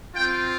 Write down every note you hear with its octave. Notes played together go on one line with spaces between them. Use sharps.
C4 F4 G5